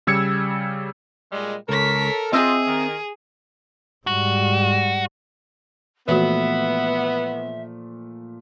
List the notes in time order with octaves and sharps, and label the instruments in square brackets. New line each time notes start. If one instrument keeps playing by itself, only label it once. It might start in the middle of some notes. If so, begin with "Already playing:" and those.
[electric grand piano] C#3 G3 E6 G#6 C#7
[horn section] A#2 G3 G#3
[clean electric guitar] C#2 [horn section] A4 A#4 [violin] C#5 B6
[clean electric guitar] C4 D#5 E5 [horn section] F4 [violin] G#4
[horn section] D#3 A#4
[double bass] G#2 G3 [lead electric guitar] F#4
[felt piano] A#2 F3 A3 [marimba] E3 F#4 [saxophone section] B3 [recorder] E5